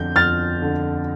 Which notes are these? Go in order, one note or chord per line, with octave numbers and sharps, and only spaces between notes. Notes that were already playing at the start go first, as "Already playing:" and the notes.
Already playing: F2 D3 G6
F2 F6 A6
D3